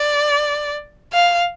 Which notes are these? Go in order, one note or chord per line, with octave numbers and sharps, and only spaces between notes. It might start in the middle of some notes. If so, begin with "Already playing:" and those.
Already playing: D5
F5